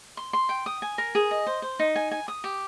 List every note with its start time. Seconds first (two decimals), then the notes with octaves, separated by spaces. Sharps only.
0.17 C6
0.33 C6
0.49 G5
0.66 D#6
0.82 G#5
0.98 A#4
1.15 G#4
1.31 D#5
1.47 C5
1.62 C5
1.79 D#4
1.96 G#5
2.11 G#5
2.28 D#6
2.44 G4